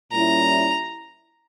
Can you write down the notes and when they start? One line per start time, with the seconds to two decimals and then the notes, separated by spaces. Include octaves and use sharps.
0.12 A#2 G3 C#4 E4 A#5